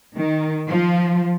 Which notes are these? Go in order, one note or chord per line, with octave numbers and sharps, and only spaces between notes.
D#3
F3